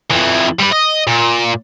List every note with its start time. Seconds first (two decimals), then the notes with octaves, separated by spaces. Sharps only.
0.11 F2 E3
0.60 G3 B4
0.73 D#5
1.07 A#2